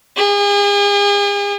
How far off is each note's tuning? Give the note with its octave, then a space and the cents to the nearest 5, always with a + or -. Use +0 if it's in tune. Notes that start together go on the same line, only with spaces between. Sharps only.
G#4 -40